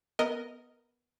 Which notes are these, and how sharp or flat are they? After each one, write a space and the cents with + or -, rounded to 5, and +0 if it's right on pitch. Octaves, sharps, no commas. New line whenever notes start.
B3 -10 A#4 -10 D#5 +0